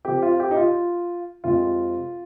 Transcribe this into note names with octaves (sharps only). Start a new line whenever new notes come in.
C3 F3 C4 G4
F4
G4
D#4
F4
F2 C3 F3 G#3 F4